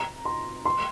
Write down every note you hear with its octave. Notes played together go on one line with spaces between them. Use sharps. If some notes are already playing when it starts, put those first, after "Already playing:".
Already playing: A#5
C6
C6